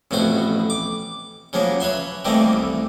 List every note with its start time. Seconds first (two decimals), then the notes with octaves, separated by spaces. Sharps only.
0.11 A1 F2 B2 F#4 C5
0.70 D6
1.53 C#3 F3 F#3 A#3
1.80 B4 C#5 E5 C6
2.25 D#3 E3 G3 A3 A#3 C4
2.53 C2